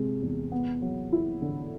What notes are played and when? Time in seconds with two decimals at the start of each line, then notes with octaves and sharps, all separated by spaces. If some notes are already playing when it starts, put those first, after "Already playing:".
Already playing: C3 G#3
0.22 E2
0.52 B3
0.82 F#3
1.13 E4
1.42 D3